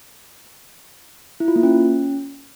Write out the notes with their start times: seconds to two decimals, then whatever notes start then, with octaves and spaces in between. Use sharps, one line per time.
1.40 E4
1.48 F4
1.56 A#3
1.63 C#4